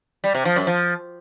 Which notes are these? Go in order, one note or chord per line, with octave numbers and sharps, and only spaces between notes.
G3
C3
F3
F#2
F3